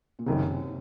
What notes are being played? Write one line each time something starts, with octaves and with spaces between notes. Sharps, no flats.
A#2
F#1 F#2 C3 D#3